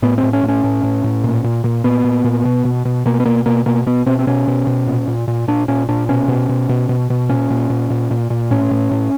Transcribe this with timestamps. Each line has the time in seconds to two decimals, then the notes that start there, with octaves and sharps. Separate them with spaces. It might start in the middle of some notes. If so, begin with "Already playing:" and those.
0.02 A2 B3
0.18 C4
0.23 A2
0.33 C#4
0.43 A2
0.49 C#4
0.64 A2
0.83 A2
1.04 A2
1.24 A#2
1.44 A#2
1.64 A#2
1.84 A#2 B3
2.04 A#2
2.24 A#2
2.45 B2
2.65 B2
2.85 B2
3.06 B2 A#3
3.20 B3
3.25 B2 A#3
3.46 B2 A#3
3.66 B2 A#3
3.86 B2 B3
4.06 B2 C4
4.19 C4
4.27 B2 C#4
4.47 B2
4.67 B2
4.87 A#2
5.08 A#2
5.28 A#2
5.48 A#2 D4
5.68 A#2 C#4
5.89 A#2 D4
6.09 B2 C#4
6.28 B2
6.49 B2
6.69 B2
6.89 B2
7.10 B2
7.29 A#2 C#4
7.50 A#2
7.70 A#2
7.90 A#2
8.11 A#2
8.30 A#2
8.51 A2 C#4
8.71 A2
8.91 A2